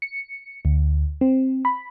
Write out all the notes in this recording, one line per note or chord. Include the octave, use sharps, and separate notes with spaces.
C#7
D2
C4
B5